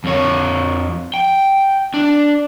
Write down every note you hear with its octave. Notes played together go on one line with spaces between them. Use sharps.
F2 C#5
G5
D4